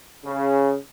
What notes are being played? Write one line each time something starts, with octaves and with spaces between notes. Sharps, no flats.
C#3